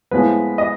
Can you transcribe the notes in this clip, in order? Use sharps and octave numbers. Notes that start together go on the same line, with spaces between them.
A2 F3 G#3 B3 B4
D#5